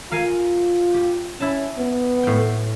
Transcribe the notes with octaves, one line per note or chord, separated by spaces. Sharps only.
F4 A#4 F5 G#5
G4
C#4 E4 A5
B3
A2 G5